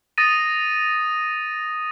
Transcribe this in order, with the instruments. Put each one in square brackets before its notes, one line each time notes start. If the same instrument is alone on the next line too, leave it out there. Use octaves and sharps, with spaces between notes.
[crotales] D#6 A6 A#6 D#7